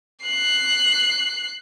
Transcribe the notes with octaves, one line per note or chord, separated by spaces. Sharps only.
F#6 C7